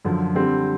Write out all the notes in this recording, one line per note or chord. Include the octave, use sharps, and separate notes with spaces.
F#2 D3 F3
D3 G3 C4